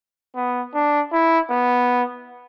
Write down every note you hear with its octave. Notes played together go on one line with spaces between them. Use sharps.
B3
D4
E4
B3